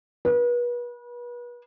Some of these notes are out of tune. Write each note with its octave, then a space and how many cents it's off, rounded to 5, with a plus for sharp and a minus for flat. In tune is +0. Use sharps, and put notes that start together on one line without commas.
B4 -35